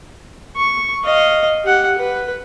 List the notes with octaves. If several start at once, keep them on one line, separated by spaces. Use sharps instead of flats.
C#6
D#5 F5
G4 F#5
B4